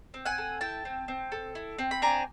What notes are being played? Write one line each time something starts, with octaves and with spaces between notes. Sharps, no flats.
C4
F#5 G#5
A4
E4 G5 A5
C4
C4
A4
E4
C4
B5
D4 G#5 A#5